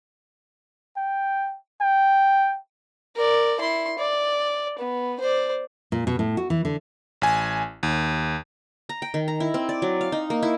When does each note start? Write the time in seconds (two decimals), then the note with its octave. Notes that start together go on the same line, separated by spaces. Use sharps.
0.97 G5
1.81 G5
3.16 A#4 D5
3.60 E4 C6
3.99 D5
4.79 B3
5.20 C5 D5
5.92 A#2
6.07 B2
6.19 A2
6.37 F#4
6.50 E3
6.65 D3
7.22 A1 G#5
7.83 D#2
8.89 A#5
9.02 G5
9.14 D#3
9.28 A#5
9.40 E4
9.54 C4
9.69 D5
9.82 F#3
10.01 F5
10.12 D#4
10.30 A#3
10.43 E4